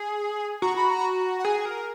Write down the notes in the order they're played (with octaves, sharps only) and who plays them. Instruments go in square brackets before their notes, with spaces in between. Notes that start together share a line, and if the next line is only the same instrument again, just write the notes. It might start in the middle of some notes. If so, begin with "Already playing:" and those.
Already playing: [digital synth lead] G#4
[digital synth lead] F#4 [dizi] A#5
[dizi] B5
A#5
F#5
[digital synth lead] G#4 [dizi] G#5
[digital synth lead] A#4